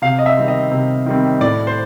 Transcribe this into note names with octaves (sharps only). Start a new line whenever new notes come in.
C3 F5
D#5
E5
D#3 G3 C4
D#5
C3
D#3 G3 C4
A2 D5
C5